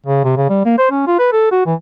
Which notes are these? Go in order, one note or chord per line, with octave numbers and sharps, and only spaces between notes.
C#3
C3
C#3
G3
A#3
C5
C#4
F4
B4
A4
F#4
E3